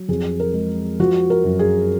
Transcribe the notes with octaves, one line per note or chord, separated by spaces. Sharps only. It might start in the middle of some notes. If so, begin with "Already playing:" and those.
Already playing: F#3
F2 G#4
A#4
G#3
F3 F#4
A#4
F#2
G#4